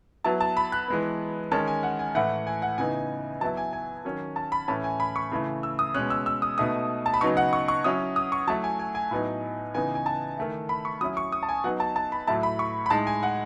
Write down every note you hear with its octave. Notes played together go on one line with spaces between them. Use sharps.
F#3 B3 E4 A5
A5
B5
F#6
E3 G#3 B3
D#3 G#3 C#4 A5
G#5
F#5
G#5
A2 E3 A3 E4 F#5
G#5
F#5
C#3 E3 B3 D#4 G#5
F#3 B3 E4 A5
G#5
G#5
D#3 F#3 C#4
A5
B5
A2 E3 A3 C#4 A5
G#5
B5
C#6
C#3 E3 A3
E6
D#6
B2 G#3 C#4 F#6
E6
E6
D#6
B2 A3 D#4 D#6
A5
B5
C#3 F#3 B3 D#4 C#6
F#5
C#6
C#6
F#3 C#4 E4 D#6
D#6
C#6
F#3 A3 E4 A5
G#5
G#5
G#5
A2 F#3 B3 D#4
C#3 E3 B3 D#4 G#5
G#5
A5
D#3 A3 E4
B5
C#6
F#3 C#4 E4 D#6
C#6
D#6
A5
G#5
F#3 B3 D#4 F#5
A5
A5
B5
A2 F#3 A3 E4 A5
B5
C#6
B5
A2 G#3 D#4 A5
G#5
F#5